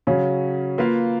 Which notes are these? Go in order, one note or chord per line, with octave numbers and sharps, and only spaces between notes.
C#3 F#3 C#4
A#3 F4 B4 F5